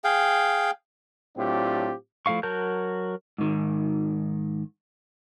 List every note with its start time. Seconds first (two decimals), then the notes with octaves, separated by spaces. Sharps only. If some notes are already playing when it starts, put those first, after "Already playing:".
0.04 G#4 F5 G5
1.37 A2 F#3 C4 D4 F4 G4
2.26 F3 A3 E4 F5 C#6
2.43 F#3 F#4 A#4 A5 G6
3.38 G#2 D#3